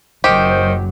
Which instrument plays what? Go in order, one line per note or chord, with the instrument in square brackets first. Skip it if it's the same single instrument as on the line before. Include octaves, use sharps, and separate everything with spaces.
[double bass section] F#1 F#2 F#3 [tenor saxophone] D#3 [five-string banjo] G4 [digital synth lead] C5